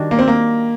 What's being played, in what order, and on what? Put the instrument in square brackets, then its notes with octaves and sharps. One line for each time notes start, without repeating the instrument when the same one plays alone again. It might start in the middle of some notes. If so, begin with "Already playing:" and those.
Already playing: [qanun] D#3 G3 D4 F#4
[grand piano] A#3
C4
A#3